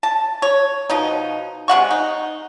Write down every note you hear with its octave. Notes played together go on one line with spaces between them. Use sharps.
A5
C#5
B2 F3 D#4
C3 G#3 F#5 C#6
D#4